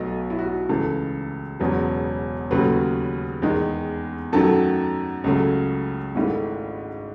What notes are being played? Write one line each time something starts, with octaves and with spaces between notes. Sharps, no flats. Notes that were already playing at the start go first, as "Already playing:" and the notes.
Already playing: B1 B2 F#3 A3 D#5
E4
F#4
C#2 C#3 E3 A3 A4
E1 E2 C#3 F#3 B3
D#2 C#3 F#3 A3 B4
E2 D#3 G#3
F#2 D#3 F#3 A3 A4
C#2 C#3 F#3 A3
G#1 G#2 D#3 A3 E4